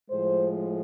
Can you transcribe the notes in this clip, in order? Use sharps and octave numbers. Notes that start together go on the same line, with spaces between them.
A2 F3 G#3 C5